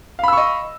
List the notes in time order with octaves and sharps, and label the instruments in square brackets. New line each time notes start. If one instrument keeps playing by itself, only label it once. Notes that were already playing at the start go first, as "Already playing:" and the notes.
[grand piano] F5
B5
E6
C#6
D#5